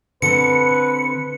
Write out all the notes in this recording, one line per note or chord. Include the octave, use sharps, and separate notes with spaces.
D3 C4 B4 C#7